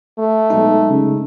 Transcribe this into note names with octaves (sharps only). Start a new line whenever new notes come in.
A3
B1 G#3 D#4
C#3